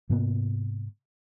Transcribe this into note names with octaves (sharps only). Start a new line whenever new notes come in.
G#2 C3 A#3 B3